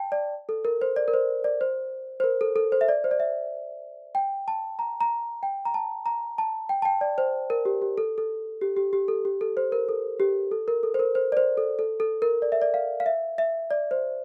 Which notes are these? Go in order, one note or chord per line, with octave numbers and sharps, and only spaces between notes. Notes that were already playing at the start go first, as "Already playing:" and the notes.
Already playing: G5 A5
D5
A4
A#4
C5
D5
A#4
C5
D5
C5
C5
A#4
A4
A4
C5
E5
D5
C5
D5
E5
G5
A5
A#5
A#5
G5
A#5
A5
A#5
A5
G5
A5
G5
D5
C5
A#4
G4
G4
A4
A4
G4
G4
G4
A4
G4
A4
C5
A#4
A4
G4
A4
A#4
A4
C5
A#4
C5
D5
C5
A4
A4
A4
A#4
D5
E5
D5
F5
F5
E5
E5
D5
C5